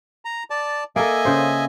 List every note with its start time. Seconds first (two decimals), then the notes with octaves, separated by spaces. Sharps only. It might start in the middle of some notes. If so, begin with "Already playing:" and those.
0.25 A#5
0.50 D5 A5
0.96 A#3 A4 D#5 E5 G#5
1.25 C#3 C5